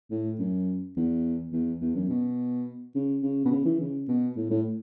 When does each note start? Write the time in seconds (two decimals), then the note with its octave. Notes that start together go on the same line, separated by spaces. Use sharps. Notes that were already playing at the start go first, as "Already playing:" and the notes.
0.11 A2
0.39 F#2
0.96 E2
1.52 E2
1.81 E2
1.96 F#2
2.09 B2
2.95 C#3
3.23 C#3
3.45 B2
3.51 C#3
3.65 E3
3.80 C#3
4.08 B2
4.37 A2
4.51 A2